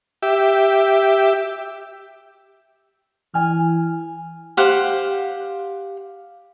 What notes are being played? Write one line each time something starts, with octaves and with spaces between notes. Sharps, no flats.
G4 E5
E3 G#5 F6
G4 C5 F5 F#5